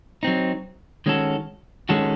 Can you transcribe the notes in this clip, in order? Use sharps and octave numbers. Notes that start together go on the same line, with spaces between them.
F#3 C4 D#4
D#3 G#3 C#4 F#4 A4
D#3 G#3 C#4 F#4 A4